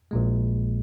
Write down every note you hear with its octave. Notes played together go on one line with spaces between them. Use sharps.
A#1 A#2 G#3